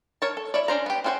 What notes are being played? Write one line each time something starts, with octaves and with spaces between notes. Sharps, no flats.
A#4 C#5 A5
A4
E4 C#5 D5
C#4 D4 C5 A#5
B3 G4
C4 C#4 F#4 G#4 C5